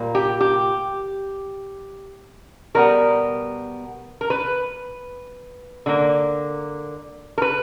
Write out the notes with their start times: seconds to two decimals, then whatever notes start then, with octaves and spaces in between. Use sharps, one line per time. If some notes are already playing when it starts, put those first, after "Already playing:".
Already playing: A#2 G3 A#3
0.15 G4
0.41 G4
2.75 B2 G3 B3 A#4
4.21 A#4
4.30 B4
5.86 D3 A#3
7.38 A#4
7.42 B4